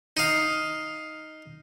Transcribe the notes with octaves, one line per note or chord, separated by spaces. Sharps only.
D#4 F5